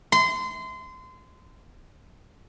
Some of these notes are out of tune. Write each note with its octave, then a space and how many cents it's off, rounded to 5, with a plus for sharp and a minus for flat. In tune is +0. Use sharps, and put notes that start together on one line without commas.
C6 -25